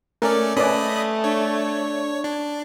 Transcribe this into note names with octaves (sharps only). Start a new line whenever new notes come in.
A3 C#4 A#4 D5 G#5
A3 C#4 B4 D5 D#5 B5 D#6
D4 C#5
D4